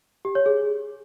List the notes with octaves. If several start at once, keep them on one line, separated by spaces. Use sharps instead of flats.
G4
C#5
G#4